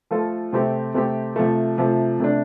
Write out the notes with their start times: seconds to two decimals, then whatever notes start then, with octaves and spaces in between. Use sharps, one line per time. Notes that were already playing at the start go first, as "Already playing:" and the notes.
0.11 F3 A3 F4 A4
0.53 C3 A3 C4 G4
0.94 C3 A3 C4 G4
1.36 C3 F3 A3
1.78 C3 F3 A3
2.20 C3 A3 D4